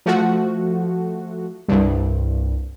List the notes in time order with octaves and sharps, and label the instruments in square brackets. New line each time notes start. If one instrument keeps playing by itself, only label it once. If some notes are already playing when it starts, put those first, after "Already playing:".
[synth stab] F3 A3 F#4
C2 G2